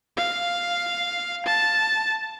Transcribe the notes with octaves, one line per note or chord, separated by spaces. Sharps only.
F5
A5